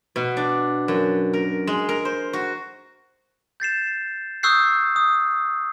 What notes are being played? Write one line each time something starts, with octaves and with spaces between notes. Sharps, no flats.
B2
D4
F#2
A#4
G#3
A#4
C5
F#4
G6 A6 C7 E7
C#6 D#6 E6 F#6 G6 C7
D#6